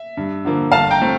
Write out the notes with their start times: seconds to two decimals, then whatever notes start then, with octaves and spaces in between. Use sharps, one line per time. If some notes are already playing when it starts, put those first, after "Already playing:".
Already playing: E5
0.17 G2
0.45 D3 F3 A#3
0.72 G1 F5 A5
0.91 G5 A#5
1.01 F3 A3 C4